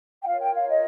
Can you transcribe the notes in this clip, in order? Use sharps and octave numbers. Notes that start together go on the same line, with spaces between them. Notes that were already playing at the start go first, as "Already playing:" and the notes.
G5
F4 A#4 C#5 F5
G5
F5
D#5